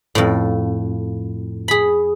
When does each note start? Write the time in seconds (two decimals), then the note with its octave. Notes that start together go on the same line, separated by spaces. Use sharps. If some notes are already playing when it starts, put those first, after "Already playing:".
0.15 F2 A2
1.68 G#4 B5